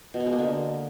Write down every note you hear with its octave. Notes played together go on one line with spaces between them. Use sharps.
B2
B3
G#3
A#3
D3